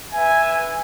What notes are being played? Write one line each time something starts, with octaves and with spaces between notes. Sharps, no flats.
B4 E5 G#5